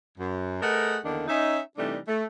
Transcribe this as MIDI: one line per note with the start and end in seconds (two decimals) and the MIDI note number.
0.18 0.59 42
0.61 0.97 57
0.61 0.97 68
0.61 0.97 70
0.61 0.97 71
0.61 0.97 75
0.61 0.97 78
1.04 1.26 40
1.04 1.26 50
1.04 1.26 51
1.04 1.26 58
1.04 1.26 62
1.28 1.59 61
1.28 1.59 63
1.28 1.59 76
1.77 1.97 48
1.77 1.97 52
1.77 1.97 55
1.77 1.97 57
1.77 1.97 62
1.77 1.97 63
2.07 2.24 57